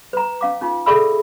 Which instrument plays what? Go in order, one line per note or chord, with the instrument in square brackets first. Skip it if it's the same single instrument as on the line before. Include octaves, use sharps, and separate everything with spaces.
[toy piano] B4 A#5
C#4 F5 D6
C#4 D#4 F4
G#4 A4 D5 E5 B5 E6